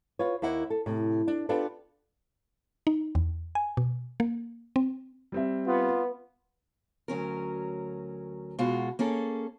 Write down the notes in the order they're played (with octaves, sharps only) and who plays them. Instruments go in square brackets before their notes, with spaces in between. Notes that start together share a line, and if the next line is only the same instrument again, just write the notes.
[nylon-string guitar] F4 B4 C#5
D#2 A#3 E4 F#5
A4
A2 C3
D4
B3 D4 F4 G4 A4 B4
[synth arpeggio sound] D#4
E2
G#5
B2
A#3
C4
[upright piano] G3 C4 E5
[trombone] B3 [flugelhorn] F4
[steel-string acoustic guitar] D2 F#3 C#4 A#4
B2 G#3 F4 F#4
A#3 C#4 G#4 A4